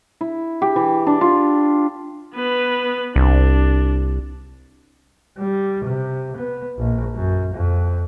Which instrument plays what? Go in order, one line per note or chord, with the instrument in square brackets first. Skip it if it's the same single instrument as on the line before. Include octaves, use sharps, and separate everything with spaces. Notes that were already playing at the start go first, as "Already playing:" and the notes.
[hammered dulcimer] E4
G4
E3
D4
F4
[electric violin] B3 B4
[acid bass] C2 [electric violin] D4
[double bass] G3
C3
B3
A#1
F#2
F2